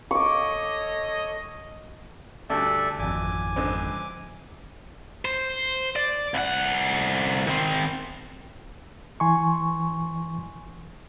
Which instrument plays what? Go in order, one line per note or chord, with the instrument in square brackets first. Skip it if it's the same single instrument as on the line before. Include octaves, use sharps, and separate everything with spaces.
[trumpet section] A4 C#5 D#5 [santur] C#6 D6
[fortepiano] D2 G2 D3 [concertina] A4 D5 E5
[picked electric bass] G#1 F2 [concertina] G#5 D6
[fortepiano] C#2 D3 C4
[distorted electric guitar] C5
D5
C2 F#5
D#3 C4
[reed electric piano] E3 G#5 C6 C#6